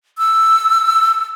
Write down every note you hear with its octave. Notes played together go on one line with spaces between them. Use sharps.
E6